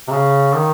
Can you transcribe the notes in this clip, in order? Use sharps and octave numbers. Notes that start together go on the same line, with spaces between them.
C3
C#3
D#3